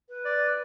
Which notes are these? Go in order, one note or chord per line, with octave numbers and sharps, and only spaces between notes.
B4
D5